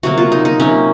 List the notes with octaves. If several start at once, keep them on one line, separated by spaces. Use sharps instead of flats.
C3 F#3 A#3 F#4
F4
D#4
D#4
C3 F#3 A#3 C#4